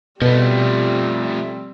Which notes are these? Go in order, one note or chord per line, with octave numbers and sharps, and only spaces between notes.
B2 F3 G3 A3 C4